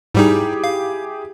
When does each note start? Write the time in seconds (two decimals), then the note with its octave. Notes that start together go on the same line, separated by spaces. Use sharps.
0.15 G#2 G3 D#4 E4 G4 G#4
0.64 F5